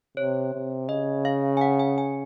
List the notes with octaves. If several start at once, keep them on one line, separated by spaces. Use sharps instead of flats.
C3 C#5
C3
C#3 D#5
F5
G#5
F#5
G#5
G#5